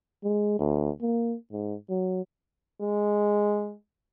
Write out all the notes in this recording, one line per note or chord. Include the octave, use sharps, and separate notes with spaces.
G#3
D2
A#3
G#2
F#3
G#3